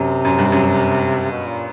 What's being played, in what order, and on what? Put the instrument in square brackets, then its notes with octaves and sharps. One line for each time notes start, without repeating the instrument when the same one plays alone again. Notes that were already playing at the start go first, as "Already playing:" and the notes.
Already playing: [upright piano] F#2 [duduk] C3
[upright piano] F#2
G2
F#2
[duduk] B2
A#2